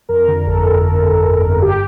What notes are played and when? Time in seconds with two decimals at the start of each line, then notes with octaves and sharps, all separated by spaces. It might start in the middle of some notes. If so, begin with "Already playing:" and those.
0.09 F2 A#4
0.28 D3
0.47 G1 A4
0.66 G1
0.85 F2 A4
1.05 G1
1.24 G1
1.43 G1
1.62 G1 G4